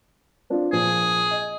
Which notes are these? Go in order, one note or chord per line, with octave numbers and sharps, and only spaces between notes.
C4 D4 F4
A#2 F3 G#4
D#5